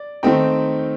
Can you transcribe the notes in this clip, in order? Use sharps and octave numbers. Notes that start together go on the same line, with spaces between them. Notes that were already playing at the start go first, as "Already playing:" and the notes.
Already playing: D5
D#3 A3 C4 D#4 G5